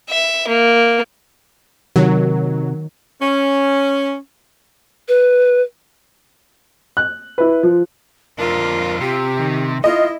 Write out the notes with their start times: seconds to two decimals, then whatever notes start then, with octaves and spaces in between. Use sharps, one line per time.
0.10 E5
0.48 A#3
1.96 C3 D#3 F#3
3.22 C#4
5.08 B4
6.97 F#6
7.38 E4 B4
7.63 F3
8.39 F2 D4 F4 A#4
9.01 C3 G4
9.38 D#3
9.84 E4 F4 D#5